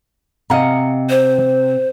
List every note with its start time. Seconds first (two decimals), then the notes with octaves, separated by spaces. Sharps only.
0.50 C3 D#5 F5 F#5 A#5
1.10 C5